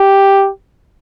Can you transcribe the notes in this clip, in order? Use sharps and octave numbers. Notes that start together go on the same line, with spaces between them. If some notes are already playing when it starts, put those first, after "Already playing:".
Already playing: G4